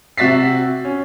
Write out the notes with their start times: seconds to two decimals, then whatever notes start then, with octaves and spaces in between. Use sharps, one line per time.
0.18 C3 F#4 E5 A6 B6 C7
0.85 C#4